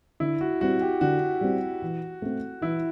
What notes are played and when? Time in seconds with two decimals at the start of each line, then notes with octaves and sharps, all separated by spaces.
0.20 D3 E4
0.41 F#4
0.61 G3 C4 F#4
0.81 G4
1.01 D3 F#4
1.41 G3 C4
1.82 E3
2.22 A3 C4
2.62 E3 E4